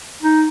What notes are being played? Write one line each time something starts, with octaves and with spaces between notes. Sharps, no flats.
D#4